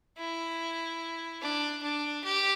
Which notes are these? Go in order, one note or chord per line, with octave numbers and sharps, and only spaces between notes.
E4
D4
D4
G4